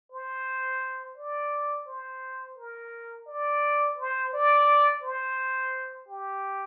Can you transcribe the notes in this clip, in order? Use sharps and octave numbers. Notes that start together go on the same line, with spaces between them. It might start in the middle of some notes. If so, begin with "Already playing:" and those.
C5
D5
C5
A#4
D5
C5
D5
C5
G4